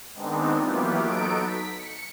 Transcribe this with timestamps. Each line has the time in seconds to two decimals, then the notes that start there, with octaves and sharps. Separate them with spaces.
0.15 D#3 G#3 B3 C4 D4 D#4
0.57 E3 F#3 A#3 B3 F4 G4
1.03 F#3 B3 D#4 A4 D7
1.43 B6
1.75 C#7